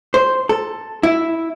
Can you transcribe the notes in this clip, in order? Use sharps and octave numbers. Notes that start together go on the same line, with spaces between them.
C5
A4
E4